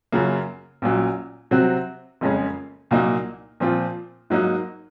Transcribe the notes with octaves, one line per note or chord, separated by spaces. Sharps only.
F#2 C#3 F#3 A#3
A#1 A#2 F#3 C#4
C3 F#3 C4 F#4
F#1 F2 C#3 G#3 C#4
C2 A#2 F#3 A#3 D#4
A#2 F3 C4 F4
G#2 F#3 A#3 D#4